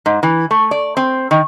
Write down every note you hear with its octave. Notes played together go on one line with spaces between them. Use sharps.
G#2
E3
A3
D5
C4
D#3